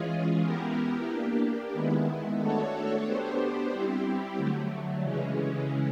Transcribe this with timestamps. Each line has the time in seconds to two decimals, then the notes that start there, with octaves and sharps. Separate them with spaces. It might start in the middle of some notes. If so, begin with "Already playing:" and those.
Already playing: E3 G#3 C#4 F4 G#4
0.42 B3 E4 G4 A#4
1.08 A#3 D4 G4
1.74 D#3 G#3 B3 E4
2.39 A3 D4 F#4 A4 C#5
3.05 B3 D4 G4 C5
3.71 G3 C4 E4 G4
4.37 D3 F#3 A3
5.02 C#3 E3 G#3 C#4